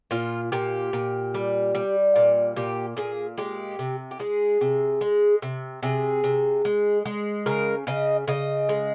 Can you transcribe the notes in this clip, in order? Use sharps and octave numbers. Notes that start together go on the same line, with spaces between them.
A#2 F4
A#2 G4
A#2
G3
G3
A#2
A#2 G4
A#2 G#4
G#3 G4
C3
G4
G#3 G#4
C3
G#3
C3
C3 G#4
C3
G#3
G#3
C#3 A#4
C#3 D#5
C#3 D#5
G#3